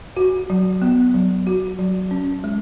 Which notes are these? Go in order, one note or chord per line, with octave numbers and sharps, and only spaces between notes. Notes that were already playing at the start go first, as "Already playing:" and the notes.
F#4
F#3
B3
F#3
F#4
F#3
C#4
G#3